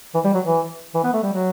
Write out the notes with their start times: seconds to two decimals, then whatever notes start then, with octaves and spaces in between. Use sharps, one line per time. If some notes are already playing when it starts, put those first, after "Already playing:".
0.14 E3
0.24 G3
0.34 F#3
0.45 E3
0.94 E3
1.04 B3
1.13 A3
1.23 G3
1.32 F#3